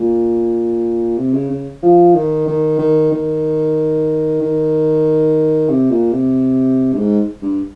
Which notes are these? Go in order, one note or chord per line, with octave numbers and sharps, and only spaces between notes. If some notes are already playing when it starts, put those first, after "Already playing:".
Already playing: A#2
C3
C#3
C#3
F3
D#3
D#3
D#3
D#3
D#3
C3
A#2
C3
G2
G#2
G2